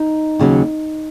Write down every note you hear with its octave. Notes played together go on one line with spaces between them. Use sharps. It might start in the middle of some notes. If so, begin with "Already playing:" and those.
Already playing: D#4
D#2 C#3 F#3